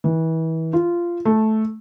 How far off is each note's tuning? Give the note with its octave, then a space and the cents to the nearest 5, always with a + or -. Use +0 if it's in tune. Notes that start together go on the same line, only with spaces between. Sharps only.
E3 -30
F4 -15
A3 -10